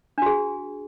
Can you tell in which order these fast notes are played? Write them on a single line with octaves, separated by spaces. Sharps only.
D4 F#4 G#4